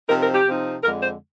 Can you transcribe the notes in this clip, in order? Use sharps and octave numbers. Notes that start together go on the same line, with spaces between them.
C3 F3 C4 D#4 A#4
A#4
G4
C3 F3 C4 D#4
F2 D3 G#3 A#4
C5